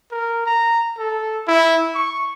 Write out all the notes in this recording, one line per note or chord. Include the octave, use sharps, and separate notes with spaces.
A#4
A#5
A4
E4
C#6